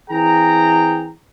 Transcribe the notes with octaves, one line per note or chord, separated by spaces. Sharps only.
E3 C4 G#4 G5 A#5